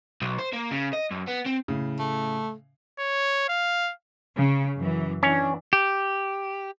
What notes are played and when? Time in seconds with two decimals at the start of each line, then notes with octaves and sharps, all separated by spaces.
0.22 B1
0.39 C5
0.53 A#3
0.71 C#3
0.93 D#5
1.11 F#2
1.27 B3
1.46 C4
1.68 A2 C#3
1.99 A3
2.99 C#5
3.49 F5
4.36 C#3
4.77 F#2 E3
5.23 E3 C#4 D4
5.73 G4